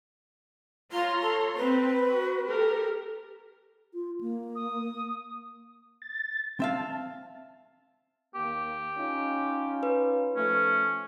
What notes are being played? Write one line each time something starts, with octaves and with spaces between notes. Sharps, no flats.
F4 C#5 A#5 C6
A4
C4 B4
F#4
G4 A4 A#4
F4
A#3
D#6
A6
C4 E5 F5 A5
D#2 A#3 G4
C#4 D#4 F4
B4
F3 A3 C#4